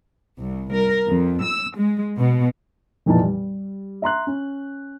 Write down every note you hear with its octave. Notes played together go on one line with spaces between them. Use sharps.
C2
A#4
F2
E6
G#3
B2
F1 F2 A#2 E3 D#4 A5
G3
E5 A#5 C6 F#6
C#4